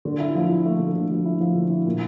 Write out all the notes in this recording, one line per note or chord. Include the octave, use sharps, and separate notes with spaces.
D3
E4
F3
E4
A3
D3
D3
F3
E4
F3
D3
E4
A#2